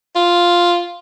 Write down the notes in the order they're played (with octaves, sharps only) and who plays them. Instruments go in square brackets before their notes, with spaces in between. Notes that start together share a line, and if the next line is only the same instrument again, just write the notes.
[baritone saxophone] F4